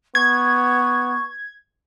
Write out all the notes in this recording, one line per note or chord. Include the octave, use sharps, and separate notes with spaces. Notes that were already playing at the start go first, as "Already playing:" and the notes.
B3 C#6 G#6